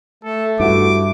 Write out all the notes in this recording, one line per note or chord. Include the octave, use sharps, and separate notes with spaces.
A3 A4
G2 E4 F#4 D6